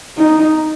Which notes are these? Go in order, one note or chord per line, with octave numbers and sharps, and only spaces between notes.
D#4